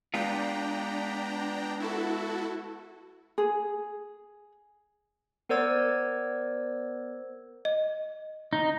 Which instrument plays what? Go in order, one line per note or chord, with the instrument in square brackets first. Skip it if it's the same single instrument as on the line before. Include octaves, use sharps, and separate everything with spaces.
[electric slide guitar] G#3 B3 F4 [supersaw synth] D4 G5 A#5
[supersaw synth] E4 F#4 A4
[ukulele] G#4
[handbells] B3 A#4 C5 D5 E6 G#6
[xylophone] D#5
[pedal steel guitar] D#4